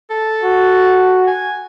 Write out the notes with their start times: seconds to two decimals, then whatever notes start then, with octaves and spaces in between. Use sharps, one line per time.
0.10 A4
0.43 F#4
1.27 G#5